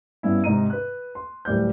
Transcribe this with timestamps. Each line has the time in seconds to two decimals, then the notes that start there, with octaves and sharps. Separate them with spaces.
0.23 G2 B3 C#4 E4
0.44 G#2 C3 D#4 D#5 A#5 D#7
0.70 B4 F#6
1.15 C6
1.45 D1 G3 G6